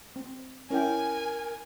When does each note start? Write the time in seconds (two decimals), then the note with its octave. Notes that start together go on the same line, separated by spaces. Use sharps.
0.16 C4
0.70 C#4 E4 A#4 G5 G#5